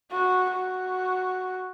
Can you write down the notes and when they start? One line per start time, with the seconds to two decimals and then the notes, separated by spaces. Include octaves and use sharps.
0.11 F#4
0.50 F#4